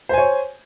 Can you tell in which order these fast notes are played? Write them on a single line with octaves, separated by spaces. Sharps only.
C5 G#5 C#5